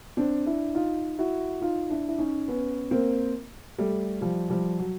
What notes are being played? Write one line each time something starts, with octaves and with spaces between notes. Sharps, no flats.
C4 D4
D4 E4
D#4 F4
E4 F#4
D#4 F4
D4 E4
E4
C#4 D#4
B3 C#4
A#3 C4
G3 A3
F3 G3
F3 G3
F#3